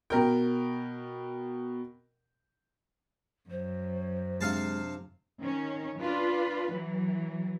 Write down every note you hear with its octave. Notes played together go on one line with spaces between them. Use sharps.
B2 A#4 G5
F#2 C5
C3 G#3 D4 F5 A5
D#3 C#4
D4 F4 B4
E3 F#3